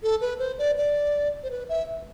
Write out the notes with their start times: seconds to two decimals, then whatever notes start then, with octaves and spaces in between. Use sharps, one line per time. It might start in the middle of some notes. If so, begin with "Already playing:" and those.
0.03 A4
0.21 B4
0.39 C5
0.58 D5
0.77 D5
1.43 C5
1.51 B4
1.69 E5